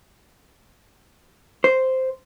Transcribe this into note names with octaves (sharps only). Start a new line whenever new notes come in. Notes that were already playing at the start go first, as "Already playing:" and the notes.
C5